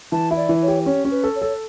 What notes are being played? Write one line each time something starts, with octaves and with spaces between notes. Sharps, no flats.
E3 A5
E4
D5
E3
C#5
G4
C#4 C#5
C#4
B4
A4
C#5
A4